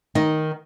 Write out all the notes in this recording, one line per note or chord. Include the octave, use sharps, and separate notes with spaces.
D#3 D#4